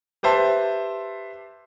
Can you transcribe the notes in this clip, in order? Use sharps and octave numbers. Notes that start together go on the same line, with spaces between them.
G4 B4 C5 E5 A5